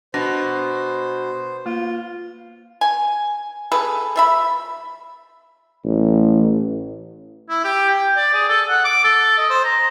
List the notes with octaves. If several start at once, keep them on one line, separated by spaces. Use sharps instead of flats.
B2 D4 C5
A#3 F4
G#5
G#4 A4 B4
F3 E5 B5
A1
E4
G4
G5
D5
G#4
A4
F#5
D6
A4
D#5
C5
A#5